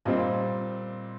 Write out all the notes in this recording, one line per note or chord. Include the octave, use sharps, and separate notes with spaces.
A#2 G3 C4 D#5